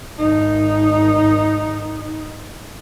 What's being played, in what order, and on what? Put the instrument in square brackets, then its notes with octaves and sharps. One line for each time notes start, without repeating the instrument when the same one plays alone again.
[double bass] G#1 D#4